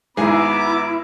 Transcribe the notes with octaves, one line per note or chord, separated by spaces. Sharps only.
G#1 G#2 B3 E4 G#4 A#5 D6